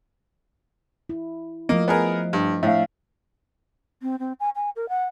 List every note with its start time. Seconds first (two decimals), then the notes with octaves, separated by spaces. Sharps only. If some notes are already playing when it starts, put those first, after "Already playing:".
1.09 E4
1.69 F3 A3 A#3 D#5
1.88 B3 G#4 A#4
2.33 G2
2.63 A2 D4 E5 F5
4.02 C4
4.19 C4
4.40 G#5
4.56 G#5
4.76 A#4
4.89 F#5